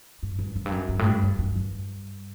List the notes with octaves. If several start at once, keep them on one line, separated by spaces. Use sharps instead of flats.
G2
G2
F#2
G2
F#2
G2
A2
G2
G2
F#2
G2